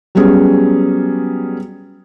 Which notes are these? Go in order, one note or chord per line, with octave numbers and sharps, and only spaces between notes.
F#3 G3 B3 C#4 G#4